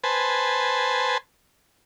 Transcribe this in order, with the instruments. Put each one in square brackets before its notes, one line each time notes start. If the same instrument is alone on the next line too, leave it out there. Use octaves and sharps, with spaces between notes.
[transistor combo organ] B4 C5 G#5 A5